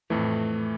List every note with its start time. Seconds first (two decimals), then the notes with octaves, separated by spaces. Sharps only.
0.10 F2 A2 E3 A3